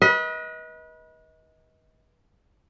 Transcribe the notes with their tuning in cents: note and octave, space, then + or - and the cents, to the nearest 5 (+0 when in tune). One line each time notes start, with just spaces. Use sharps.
B4 -30 D#5 +30